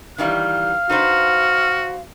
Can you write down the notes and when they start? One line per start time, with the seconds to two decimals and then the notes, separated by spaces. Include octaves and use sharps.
0.18 D#3 E3 G3 F5 F6
0.89 D#4 F#4 B4 C5